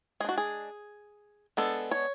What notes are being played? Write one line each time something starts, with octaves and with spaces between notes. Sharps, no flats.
G#3 D4 F#4 G#4
G#4
G#3 B3 D4 A4
C#5